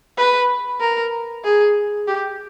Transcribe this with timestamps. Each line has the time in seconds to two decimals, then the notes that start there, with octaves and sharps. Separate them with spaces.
0.18 B4
0.81 A#4
1.44 G#4
2.08 G4